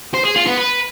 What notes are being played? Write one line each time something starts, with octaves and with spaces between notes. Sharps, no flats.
C5
G#4
F4
B3
B4